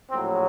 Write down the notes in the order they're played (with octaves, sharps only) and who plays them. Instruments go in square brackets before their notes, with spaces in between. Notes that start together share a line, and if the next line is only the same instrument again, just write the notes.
[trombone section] A#1 A2 F#3 C4